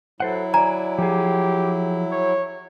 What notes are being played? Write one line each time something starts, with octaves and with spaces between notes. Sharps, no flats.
F#3 E4 A4 C5 F#5
D5 G#5 A#5
F3 G4 G#4
C#5